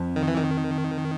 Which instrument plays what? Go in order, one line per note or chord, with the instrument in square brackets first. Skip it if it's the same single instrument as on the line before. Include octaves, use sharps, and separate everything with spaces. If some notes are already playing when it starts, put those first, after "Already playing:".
Already playing: [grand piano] F2 F3
[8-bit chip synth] D#3
E3
D#3